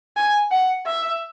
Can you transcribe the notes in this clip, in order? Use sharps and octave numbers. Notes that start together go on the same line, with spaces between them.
G#5
F#5
E5